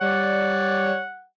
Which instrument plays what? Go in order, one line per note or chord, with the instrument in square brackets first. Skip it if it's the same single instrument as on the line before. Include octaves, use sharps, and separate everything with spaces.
[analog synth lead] G3 [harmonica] C#5 D5 [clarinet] F#5